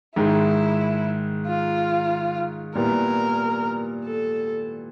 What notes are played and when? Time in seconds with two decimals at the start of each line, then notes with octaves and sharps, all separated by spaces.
0.16 G#2 D#3 G#3 E4
1.46 F4
2.75 A#2 G3 B3 E4 A#4
4.05 A4